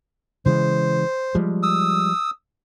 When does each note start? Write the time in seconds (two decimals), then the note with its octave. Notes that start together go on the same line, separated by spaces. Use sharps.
0.46 C#3 E3 G#3 C5
1.35 F3 G3 G#3
1.63 D#6 E6